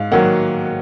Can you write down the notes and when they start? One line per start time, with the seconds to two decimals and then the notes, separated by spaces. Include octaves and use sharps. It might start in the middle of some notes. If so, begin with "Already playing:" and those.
Already playing: G#2 F5
0.11 D#3 F#3 A#3 F#5